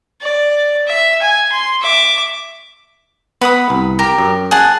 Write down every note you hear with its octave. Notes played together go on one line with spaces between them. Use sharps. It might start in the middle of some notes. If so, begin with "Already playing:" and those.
D5
E5
G#5
C6
E5 D6
B3 B4 F#5 B5 D#6
C2
G4 A#4
F#2
G#4 F#5 A5